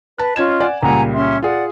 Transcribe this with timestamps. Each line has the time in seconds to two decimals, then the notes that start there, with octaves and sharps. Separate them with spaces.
0.18 B4 A5 F#6
0.36 C#4 F4 D#5 G#6 E7
0.60 D5 F#5 G#5
0.83 C#2 A#2 G3 F#5 G#5 A#5
1.13 C#4 E5 C6
1.42 F4 G#4 D5 F#5